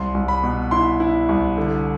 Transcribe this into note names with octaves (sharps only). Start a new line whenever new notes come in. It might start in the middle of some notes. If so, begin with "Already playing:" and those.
Already playing: C2 C6
C2
B5
B2
E4 C6
E4
C2
D3